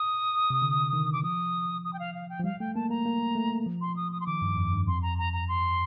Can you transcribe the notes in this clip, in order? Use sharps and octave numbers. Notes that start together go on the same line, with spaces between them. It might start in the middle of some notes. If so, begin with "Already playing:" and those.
Already playing: D#6
C3
D3
D#3
D6
F3 D#6
D#6
G5
F5
F5
G5
F3
G3 F5
A3 G5
A#3 A5
A#3 A#5
A#3
A3
F3
C6
D#6
D#6
C6
D#3 D6
G2
F2
G2
F2 C6
A#5
A#5
A#5
C6